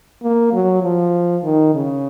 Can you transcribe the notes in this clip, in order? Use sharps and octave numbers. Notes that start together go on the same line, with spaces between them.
A#3
F#3
F3
D#3
C#3